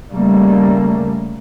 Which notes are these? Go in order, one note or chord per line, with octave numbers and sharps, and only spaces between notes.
C#3 G3 A3 A#3